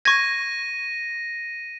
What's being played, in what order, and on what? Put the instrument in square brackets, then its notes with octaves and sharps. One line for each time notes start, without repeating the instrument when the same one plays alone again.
[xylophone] C#6 G#6 [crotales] A#6 D#7